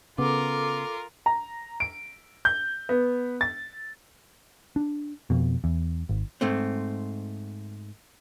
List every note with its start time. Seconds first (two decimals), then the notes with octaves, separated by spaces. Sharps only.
0.18 C#3 B3 F4 A4 A#4 D6
1.26 A#5
1.80 D7
2.45 G6
2.89 B3
3.41 A6
4.76 D4
5.30 F2 B2
5.64 E2
6.09 G#1
6.41 G#2 A3 C4